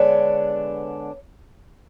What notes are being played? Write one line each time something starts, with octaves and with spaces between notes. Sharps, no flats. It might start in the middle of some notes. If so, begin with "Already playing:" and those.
Already playing: D3 G#3 B3 D4 C#5